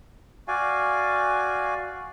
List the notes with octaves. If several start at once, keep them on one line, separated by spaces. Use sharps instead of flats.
F#4 D5 F5 G#5